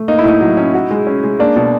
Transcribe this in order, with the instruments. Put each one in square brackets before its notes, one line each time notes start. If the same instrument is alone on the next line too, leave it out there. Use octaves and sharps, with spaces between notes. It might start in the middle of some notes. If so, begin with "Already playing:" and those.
Already playing: [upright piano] A3
[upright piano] A#3 [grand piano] D#4
[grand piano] E4
[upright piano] A2 [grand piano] D#4
[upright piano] F#3
C#4
F#4
G#3
C#4
G#3
[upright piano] A#3 [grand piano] D4
[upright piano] B2